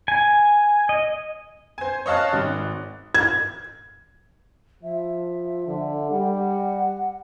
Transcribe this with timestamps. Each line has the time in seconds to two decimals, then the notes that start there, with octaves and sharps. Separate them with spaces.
0.08 G#5
0.89 D#5
1.78 C5 G#5
2.06 C#5 D#5 F5 A5 F#6
2.33 G#1
3.14 G#6
4.83 F3 E5
5.67 D3
6.11 G3 F#5